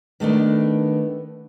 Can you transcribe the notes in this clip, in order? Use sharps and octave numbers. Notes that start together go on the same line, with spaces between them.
D#3 A3 B3 D4